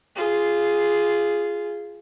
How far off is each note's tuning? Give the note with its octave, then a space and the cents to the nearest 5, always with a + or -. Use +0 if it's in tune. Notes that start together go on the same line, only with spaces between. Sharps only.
F4 -10 G#4 +0